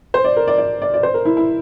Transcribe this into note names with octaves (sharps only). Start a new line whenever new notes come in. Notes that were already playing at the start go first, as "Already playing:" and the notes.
C5
D5
A#4
D5
D5
D5
D5
C5
A#4
E4
E4